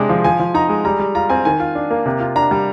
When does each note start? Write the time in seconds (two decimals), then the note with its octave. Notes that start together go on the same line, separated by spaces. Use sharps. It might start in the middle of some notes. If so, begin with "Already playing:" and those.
Already playing: C3 G#3 D4
0.09 F3
0.24 F3 G#5
0.40 F3
0.54 D#4 A#5
0.69 G#3
0.85 G3 A#5
1.00 G3
1.15 F4 A#5
1.30 C4 G#5
1.45 D#3 G#5
1.60 F4
1.75 D4
1.90 A#3
2.06 C3
2.20 F4
2.36 D4 A#5
2.51 G3